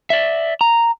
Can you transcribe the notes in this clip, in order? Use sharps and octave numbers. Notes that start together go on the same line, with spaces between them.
D5 E5
A#5